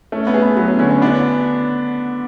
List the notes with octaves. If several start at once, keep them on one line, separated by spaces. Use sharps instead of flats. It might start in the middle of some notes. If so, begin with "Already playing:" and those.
A3 C#4
B3
G#4
B3
F#3 B3
C#4
D3 C#4
C#4
B3 D4